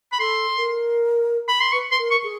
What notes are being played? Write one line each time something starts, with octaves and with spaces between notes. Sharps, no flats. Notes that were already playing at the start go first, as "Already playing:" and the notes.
B5
A4 C6
A#4
B5
C6
B4 C#6
C6
A#4
C#6
G#4